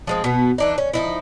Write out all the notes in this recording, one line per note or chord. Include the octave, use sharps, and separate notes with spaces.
F3 G#3 C4
B2 B3
E3 D4 D#4
C#4
F3 D#4 E4